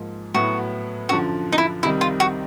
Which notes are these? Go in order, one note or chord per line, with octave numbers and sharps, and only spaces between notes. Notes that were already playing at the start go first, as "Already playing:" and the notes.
Already playing: G#2 F3 A#3
A2 F#3 B3 E4 F#4
F#2 D3 F3 F#4
D#4
E4
C2 C3 D#3 G3 E4
F4
F#4